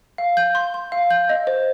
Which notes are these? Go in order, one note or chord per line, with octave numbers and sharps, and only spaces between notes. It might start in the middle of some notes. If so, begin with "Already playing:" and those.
F5
G6
C6
C6
F5
G6
D#5
C5